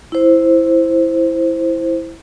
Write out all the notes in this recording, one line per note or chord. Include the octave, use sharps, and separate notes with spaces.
E4 C5